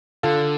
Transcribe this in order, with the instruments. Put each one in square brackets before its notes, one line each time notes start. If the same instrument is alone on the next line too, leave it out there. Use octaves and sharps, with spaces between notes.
[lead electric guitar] D3 [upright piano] F4 A4